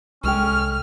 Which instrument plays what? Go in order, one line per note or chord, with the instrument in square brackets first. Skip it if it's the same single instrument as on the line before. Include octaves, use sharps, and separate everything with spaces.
[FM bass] C2 [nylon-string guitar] G#3 A4 G5 [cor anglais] C#4 [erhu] F6